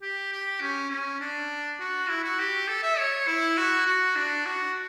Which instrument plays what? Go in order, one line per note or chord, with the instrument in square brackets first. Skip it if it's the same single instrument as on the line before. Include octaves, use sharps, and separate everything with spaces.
[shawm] G4
G4
C#4
C#4
D4
F#4
E4
F#4
G4
A4
E5
C#5
E4
F#4
F#4
D4
F#4